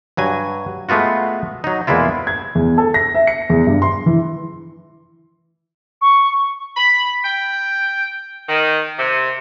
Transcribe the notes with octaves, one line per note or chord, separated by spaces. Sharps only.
G2 F#3 G#5
G#3 A3 B3 F4 F#4
F#3 D#4
E2 G#3 A#3 E4 F4
G#6
E2
A4
A#6
E5
C#7
E2
G2
C6
E3
C#6
B5
G5
D#3
C3